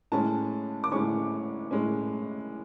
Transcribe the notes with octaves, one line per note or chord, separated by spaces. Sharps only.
A2 G#3 C#4 A5
D6
A2 G#3 C#4 C#6
A2 G#3 C#4